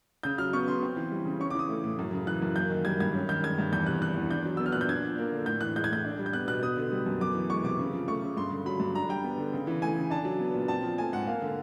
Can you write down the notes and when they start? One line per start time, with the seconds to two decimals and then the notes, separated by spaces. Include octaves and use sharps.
0.23 C#3 G6
0.38 F#3 F6
0.53 B3 C#6
0.68 C#3 C6
0.83 C4
0.96 E3
1.12 G3
1.25 C#3
1.40 C#4 C#6
1.50 D6
1.54 E3 D#6
1.69 A3
1.84 A2
1.99 F#2
2.13 C#3
2.27 E3 F#6
2.42 F#2
2.56 A#3 G6
2.70 D#3
2.85 G3 G#6
3.00 G2 G#6
3.14 C#4
3.29 D#3 G6
3.43 G#3 G#6
3.58 G2
3.72 E2 G6
3.86 C3 F#6
4.01 E3 F#6
4.16 E2
4.31 D4 G6
4.45 F#3
4.57 B3 E6
4.66 F6
4.72 A#2 F#6
4.81 G6
4.88 D4 G#6
5.04 F3
5.18 A#3
5.33 D3
5.46 A2 G6
5.61 E3 F#6
5.76 G#3 G6
5.84 G#6
5.90 A2 G6
6.05 D4
6.19 G3
6.26 G6
6.33 B3 F#6
6.48 B2 F#6
6.63 B3 D#6
6.77 D3
6.92 G3
7.06 F#2
7.21 B3 D6
7.35 E3
7.50 G#3 C#6
7.64 C3 D6
7.79 C#3
7.93 F3
8.08 A3 C#6
8.23 C#3
8.37 G2 C6
8.52 D3
8.66 F#3 B5
8.80 G2
8.95 D4 A#5
9.09 G3 G5
9.24 B3
9.38 D3
9.53 C#3
9.67 E3
9.82 A3 G#5
9.97 C#3
10.10 D4 A5
10.25 F#3
10.40 B3
10.54 A#2
10.68 C4 A5
10.83 F3
10.98 A3 G#5
11.13 G#2 F#5
11.27 A#3 F5
11.42 D3